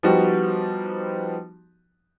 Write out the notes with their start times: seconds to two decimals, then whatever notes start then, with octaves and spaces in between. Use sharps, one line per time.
0.03 F3 G3 B3 D#4 F#4 G4